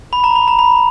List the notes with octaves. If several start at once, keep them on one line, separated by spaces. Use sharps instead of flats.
B5
A#5
B5
A#5
B5